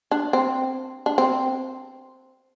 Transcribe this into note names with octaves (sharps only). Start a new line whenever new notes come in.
D4
C4
D4
C4